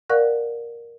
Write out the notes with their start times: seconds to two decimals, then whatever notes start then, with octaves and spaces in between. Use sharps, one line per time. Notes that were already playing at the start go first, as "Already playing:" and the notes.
0.09 A#4 D5 F5 F#5 C#6 F#6